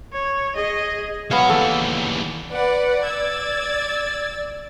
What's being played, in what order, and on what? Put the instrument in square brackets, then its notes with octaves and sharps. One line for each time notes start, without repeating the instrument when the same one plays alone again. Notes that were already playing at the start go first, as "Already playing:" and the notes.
[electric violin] C#5
G#4 D#5
[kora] B3 C#4 F5 [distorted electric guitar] F#4 C#5
[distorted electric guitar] D#2 E3 [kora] A4
[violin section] B4 D5 F#5
D5 E6 G#6 A6